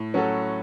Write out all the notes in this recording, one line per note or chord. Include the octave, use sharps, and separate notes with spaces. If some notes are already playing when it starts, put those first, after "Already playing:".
Already playing: A2
F#3 C#4 F#4 A4